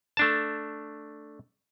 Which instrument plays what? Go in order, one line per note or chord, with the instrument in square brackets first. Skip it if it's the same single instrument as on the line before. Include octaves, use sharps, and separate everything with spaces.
[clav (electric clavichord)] A3 D4 A5